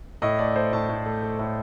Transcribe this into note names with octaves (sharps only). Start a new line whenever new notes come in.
A2 D#5
A3 D5
A3 C5
A2 A5
A2
A3
A3
A2